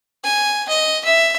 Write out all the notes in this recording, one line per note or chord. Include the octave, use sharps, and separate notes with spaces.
G#5
D#5
E5